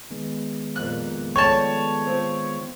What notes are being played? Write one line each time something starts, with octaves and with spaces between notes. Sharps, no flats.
D#3 G#3 B3
F2 A#2 F#6
F3 A3 C#5 D5 G5 A5
C4 F4 C5